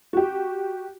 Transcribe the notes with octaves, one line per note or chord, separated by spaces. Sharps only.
F#4 G4